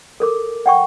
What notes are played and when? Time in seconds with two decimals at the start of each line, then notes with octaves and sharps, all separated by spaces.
0.20 A4 A#4 D6
0.66 F#5 G5 C#6